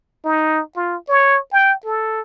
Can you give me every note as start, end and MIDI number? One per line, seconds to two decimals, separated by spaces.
0.25 0.62 63
0.76 0.97 65
1.09 1.39 73
1.53 1.74 79
1.85 2.21 69